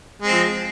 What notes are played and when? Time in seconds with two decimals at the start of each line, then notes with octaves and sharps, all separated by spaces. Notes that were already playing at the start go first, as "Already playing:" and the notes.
0.22 G#3
0.26 C4
0.31 F3